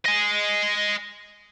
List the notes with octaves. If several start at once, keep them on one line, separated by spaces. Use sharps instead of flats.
D#5 G#5